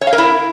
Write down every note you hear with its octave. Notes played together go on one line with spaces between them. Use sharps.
C#5
F5
A#4
E4